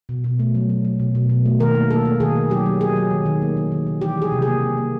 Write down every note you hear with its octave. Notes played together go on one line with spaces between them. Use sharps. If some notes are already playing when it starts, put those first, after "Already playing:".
B2
B2
A3
F#3
F#3
F#3
B2
B2
B2
A3
D#3 A#4
A#3
A#3 A4
A#3
D#3 G#4
D#3
F#3 G4
F#3
F#3 G#4
F#3
D#3
D#3
A#3
D#3
D#3
D#3
E3 G4
E3 G#4
C3
G#4
A#3
A#3
A#3